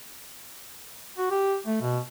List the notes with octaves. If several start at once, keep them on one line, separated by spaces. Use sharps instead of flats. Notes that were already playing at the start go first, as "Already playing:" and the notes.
F#4
G4
A3
B2